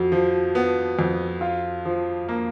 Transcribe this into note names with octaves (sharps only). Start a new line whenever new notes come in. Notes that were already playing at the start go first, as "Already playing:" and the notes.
Already playing: F2 F#4
F3
B3
F2
F4
F3
A#3